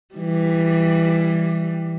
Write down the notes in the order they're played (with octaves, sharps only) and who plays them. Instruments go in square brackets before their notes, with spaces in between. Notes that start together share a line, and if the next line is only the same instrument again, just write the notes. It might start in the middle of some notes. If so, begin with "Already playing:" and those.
[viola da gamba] E3 G3